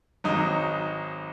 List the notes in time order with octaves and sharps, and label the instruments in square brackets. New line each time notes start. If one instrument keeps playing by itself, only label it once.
[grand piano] G#1 G#2 F#3 D#4